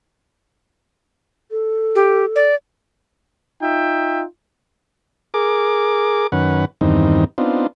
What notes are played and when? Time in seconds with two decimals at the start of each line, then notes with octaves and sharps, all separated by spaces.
1.51 A4
1.95 G4
2.36 D5
3.61 D#4 F4 E5 G5
5.34 G#4 A#4 D6
6.32 F#2 D#3 C#4 B4 F#5
6.81 E2 G2 D#3 C4 D#4
7.38 B3 C4 D4 D#4 F4